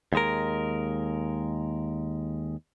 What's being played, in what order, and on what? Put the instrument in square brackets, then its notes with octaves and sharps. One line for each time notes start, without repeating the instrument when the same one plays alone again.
[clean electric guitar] D#2 G#3 A#4